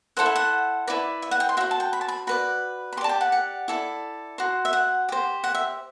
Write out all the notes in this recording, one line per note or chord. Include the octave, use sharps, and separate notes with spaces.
E4 A4 C5 F#5
E5
F#5
E4 B4 D5
E5
F#5
G5
C6
F#4 C5 E5
A5
G5
B5
A5
B5
F#4 B4 D5 B5
B5
G4 D5 A5 C6
G5
F#5
F#5
E4 A4 D5
F#4 C5
E5
F#5
G4 C5
F#5
E5